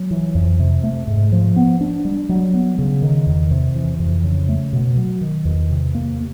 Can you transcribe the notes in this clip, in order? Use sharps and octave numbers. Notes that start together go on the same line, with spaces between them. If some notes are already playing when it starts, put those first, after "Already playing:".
Already playing: F#3
E3
F2
C3
A3
G#2
F3
B3
D4
G3
F#3
B3
C#3
D#3
E2
C3
E3
F2
C#3
A3
B2
F#3
D#3
E2
C3
A#3